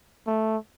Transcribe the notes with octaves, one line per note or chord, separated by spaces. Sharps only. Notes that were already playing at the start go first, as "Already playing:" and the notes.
A3